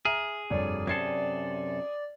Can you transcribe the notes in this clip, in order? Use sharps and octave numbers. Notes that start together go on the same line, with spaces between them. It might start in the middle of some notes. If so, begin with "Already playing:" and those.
G#4 E5 A#5 F6
F1 G2 C#5 D5
F#2 C3 A4 G#6 C7